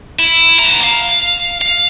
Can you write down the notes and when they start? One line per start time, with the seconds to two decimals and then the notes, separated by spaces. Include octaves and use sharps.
0.19 E4
0.59 B3 A#5
0.84 F5
1.62 F5